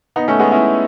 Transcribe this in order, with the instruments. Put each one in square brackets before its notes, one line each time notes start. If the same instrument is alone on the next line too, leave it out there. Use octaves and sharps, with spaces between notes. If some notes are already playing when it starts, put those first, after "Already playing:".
[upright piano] B3 D#4
A3 C#4
G#3 B3
C#4 E4